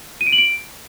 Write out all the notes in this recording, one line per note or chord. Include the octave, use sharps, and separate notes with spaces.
D#7
D7
F#7
D7